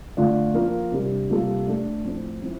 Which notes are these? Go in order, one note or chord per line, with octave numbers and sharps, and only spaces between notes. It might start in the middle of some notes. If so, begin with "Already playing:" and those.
D3 A3 D4 F4
F3 A#3 F4 A#4
C3 G3 D4
C3 G3 A#3 F4 A4
A3 D4 A4
A2 F3 C4
F3 C4 E4